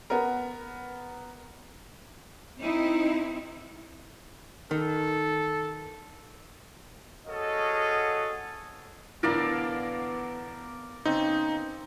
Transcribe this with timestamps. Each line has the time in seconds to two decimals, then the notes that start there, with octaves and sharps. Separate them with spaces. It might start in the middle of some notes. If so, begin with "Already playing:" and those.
0.10 B3 A#4
2.59 C4 D#4 E4
4.71 D#3 A4
7.27 F#4 G#4 A4 C#5 D#5 F5
9.23 A2 D3 E3 B3 A#4 D5 F5
11.05 C#3 B3 C4 D#4